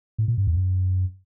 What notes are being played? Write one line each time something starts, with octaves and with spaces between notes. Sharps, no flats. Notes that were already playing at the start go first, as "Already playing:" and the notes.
A2
A#2
G2
E2
F#2